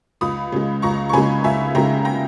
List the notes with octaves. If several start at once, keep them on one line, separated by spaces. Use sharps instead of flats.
C#2 B5 D#6
C#3 G#3
C#2 A#5 C#6
C#6
C#3 G#3 G#5 B5
C#2 E5 G#5
C#3 G#3 G5 A#5
G5 A#5